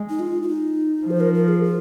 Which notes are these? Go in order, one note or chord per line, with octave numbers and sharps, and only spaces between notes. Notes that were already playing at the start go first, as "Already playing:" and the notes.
Already playing: G#3
D#4
F4
F4
D#4
F3 C5
A#4
A#4
G#4
F4